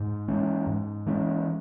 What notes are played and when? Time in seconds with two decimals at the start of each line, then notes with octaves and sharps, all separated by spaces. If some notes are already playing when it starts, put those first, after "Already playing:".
Already playing: G#2
0.28 E3 G#3 C#4
0.67 G#2
1.06 E3 G#3 C#4